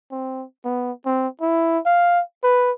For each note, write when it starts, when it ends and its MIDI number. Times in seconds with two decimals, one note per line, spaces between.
0.12 0.45 60
0.65 0.92 59
1.06 1.28 60
1.41 1.79 64
1.86 2.21 77
2.44 2.72 71